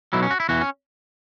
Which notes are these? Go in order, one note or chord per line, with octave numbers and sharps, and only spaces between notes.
B1 B2 F#3 E4
C#4
F#4
E4
E2 E3 F#4
C#4